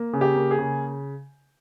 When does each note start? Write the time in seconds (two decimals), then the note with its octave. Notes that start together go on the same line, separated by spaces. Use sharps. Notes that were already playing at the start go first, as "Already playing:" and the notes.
Already playing: A#3
0.13 C#3
0.21 G4
0.36 A#3
0.51 G#4
0.59 C#3